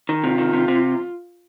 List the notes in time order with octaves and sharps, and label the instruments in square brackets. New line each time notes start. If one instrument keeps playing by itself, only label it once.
[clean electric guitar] D#3
[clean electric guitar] C3 [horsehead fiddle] F4
[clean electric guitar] D#3
C3
C3